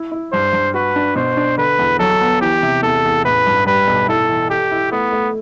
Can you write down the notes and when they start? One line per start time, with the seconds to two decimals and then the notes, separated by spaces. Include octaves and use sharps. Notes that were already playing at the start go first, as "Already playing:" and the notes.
Already playing: E4
0.12 E4
0.33 G2 C5
0.53 G2
0.74 F#4 B4
0.96 D4
1.15 B2 C5
1.37 D4
1.58 D3 B4
1.79 E2
1.99 F#3 A4
2.21 B3
2.41 E3 G4
2.63 C3
2.83 E2 A4
3.05 E2
3.25 A1 B4
3.47 G2
3.66 G3 B4
3.88 B1
4.08 E4 A4
4.29 E3
4.50 G4 A4
4.72 E4
4.92 A3 B3
5.13 A3